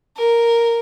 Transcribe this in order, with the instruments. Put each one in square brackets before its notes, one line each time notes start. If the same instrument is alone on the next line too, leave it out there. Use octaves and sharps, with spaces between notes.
[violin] A#4